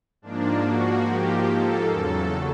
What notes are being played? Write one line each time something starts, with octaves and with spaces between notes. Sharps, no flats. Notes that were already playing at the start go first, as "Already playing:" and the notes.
G#2 F3 A#3 D4
F#4
G4
A4
E2 C#3 F#3 A4